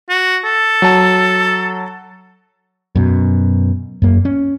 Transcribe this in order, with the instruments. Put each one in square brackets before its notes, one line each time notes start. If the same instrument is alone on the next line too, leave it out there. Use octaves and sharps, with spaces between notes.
[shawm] F#4
A4
[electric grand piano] F#3 A5
[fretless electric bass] F#2 B2
F#2 A#3
C#4